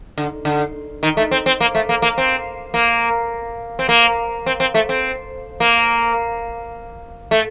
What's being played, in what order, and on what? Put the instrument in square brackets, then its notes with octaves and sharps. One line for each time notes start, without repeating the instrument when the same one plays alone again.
[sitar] D3
D3
D#3
A3
C4
C4
A#3
A3
A#3
A#3
C4
A#3
C4
A#3
C4
C4
A3
C4
A#3
A3